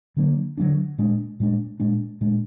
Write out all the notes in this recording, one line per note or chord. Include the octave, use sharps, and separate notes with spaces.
D3 F#3 A#3 D4
D3 F#3 A#3 D4
A#2 G#3 D4
A#2 G#3 D4
A#2 G#3 D4
A#2 G#3 D4